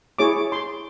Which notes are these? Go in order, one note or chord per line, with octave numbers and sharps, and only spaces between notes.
E4 G#4 C#5 D6
C6